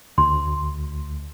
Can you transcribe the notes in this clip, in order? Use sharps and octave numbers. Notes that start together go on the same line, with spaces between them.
D2 C6